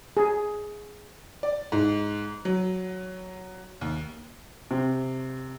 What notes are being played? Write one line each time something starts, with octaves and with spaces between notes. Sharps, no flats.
G#4
D5
G#2
F#3
D#2
C3